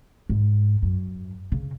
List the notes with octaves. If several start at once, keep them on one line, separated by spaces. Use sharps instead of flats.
G#2
F#2
C#3